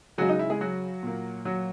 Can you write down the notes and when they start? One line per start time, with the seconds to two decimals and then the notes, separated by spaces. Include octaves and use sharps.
0.18 C#3 F#3 G#3 F#4
0.29 D#4
0.39 E4
0.50 G#3 G#4
0.61 F#3 F#4
1.03 A#2 A#3
1.45 F#3 F#4